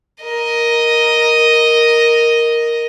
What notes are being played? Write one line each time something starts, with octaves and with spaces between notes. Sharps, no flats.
A#4 D#5